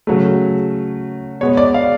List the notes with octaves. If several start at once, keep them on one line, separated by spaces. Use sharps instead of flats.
C#3 F#3 A3
B2 G#3 B3 C#5
D5
F5